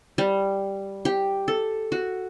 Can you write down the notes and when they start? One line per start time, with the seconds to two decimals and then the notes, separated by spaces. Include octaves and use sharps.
0.18 G3
1.05 G4
1.48 A4
1.92 F#4